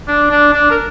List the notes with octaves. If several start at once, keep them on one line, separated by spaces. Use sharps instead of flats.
D4
D4
D4
A#4